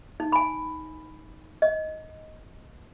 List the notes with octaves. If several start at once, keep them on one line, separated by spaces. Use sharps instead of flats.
D#4
G#5 B5
D#5